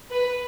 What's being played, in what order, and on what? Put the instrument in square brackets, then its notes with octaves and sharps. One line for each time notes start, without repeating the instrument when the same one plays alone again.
[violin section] B4